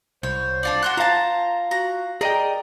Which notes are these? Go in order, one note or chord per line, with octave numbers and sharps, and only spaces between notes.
C2 C5 C#5
D4 F4 D5
F#4 C6 F#6
F4 C5 F5 A5 A#5
F#4 A#5
G#4 A#4 D5 D#5 G5